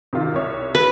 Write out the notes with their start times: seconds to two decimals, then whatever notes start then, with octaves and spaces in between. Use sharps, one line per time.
0.13 C3 D#3 F4
0.34 C2 C#5 E5
0.75 B4